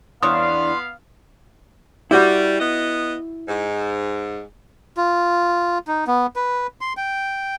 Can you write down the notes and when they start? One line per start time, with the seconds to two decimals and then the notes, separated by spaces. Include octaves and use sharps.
0.23 E2 B3 D4 C#5 F5 C6 D#6
2.11 G3 E4 F#4
2.58 B3 D#5
3.48 G#2
4.97 F4
5.88 D#4
6.07 B3
6.36 B4
6.81 C6
6.97 G5